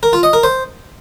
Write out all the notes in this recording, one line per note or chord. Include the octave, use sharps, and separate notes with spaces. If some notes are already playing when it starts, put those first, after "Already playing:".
A#4
F4
D#5
A#4
C5